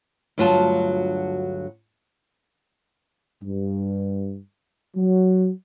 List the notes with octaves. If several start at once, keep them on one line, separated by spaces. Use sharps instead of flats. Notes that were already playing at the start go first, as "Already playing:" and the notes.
D2 G2 F#3 F4 F#4 A5
G2
F#3